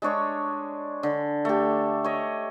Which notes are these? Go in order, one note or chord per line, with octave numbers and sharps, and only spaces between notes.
G#3 D4 C#5 C#6
D3
A3 G4
C#5 D#5